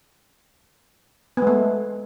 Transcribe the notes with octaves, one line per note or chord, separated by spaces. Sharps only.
G#3 A3 B3